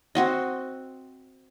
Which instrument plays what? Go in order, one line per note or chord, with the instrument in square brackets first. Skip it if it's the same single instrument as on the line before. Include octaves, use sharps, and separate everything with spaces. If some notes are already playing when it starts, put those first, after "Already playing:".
[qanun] C4 F#4 D#5